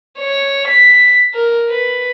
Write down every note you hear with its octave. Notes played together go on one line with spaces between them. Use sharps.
C#5
B6
A#4
B4